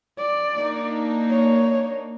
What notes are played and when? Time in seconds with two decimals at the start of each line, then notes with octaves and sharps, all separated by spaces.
0.18 D5
0.55 A#3 D4 D#4
1.30 C#5